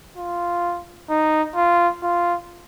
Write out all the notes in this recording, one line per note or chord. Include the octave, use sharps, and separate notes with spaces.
F4
D#4
F4
F4